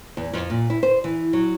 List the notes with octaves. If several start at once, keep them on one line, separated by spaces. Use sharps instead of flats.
E2
F2
A#2
E4
C5
E3
F#3